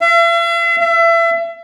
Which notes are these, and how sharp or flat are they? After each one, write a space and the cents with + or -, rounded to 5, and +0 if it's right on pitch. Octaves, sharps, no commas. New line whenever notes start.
E5 +45
E5 +30